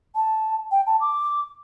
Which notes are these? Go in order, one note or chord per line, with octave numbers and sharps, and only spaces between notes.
A5
G5
A5
D6